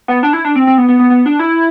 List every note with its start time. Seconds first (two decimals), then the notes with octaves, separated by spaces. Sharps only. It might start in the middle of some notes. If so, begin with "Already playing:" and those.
0.08 B3
0.23 D4
0.33 E4
0.45 D4
0.55 C4
0.67 C4
0.78 B3
0.88 B3
0.99 B3
1.10 B3
1.26 D4
1.39 E4